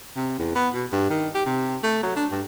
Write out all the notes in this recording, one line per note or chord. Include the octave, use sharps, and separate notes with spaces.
C3
E2
B3
B2
G2
D#3
G4
C3
A3
F#3
D4
G2